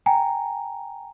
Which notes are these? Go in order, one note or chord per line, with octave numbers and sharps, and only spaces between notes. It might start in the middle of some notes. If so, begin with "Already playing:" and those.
G5 G#5 A#5